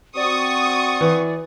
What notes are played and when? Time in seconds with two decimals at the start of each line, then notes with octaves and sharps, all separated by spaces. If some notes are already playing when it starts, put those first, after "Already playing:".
0.17 C4 F#4 D5 C#6 D#6
1.01 E3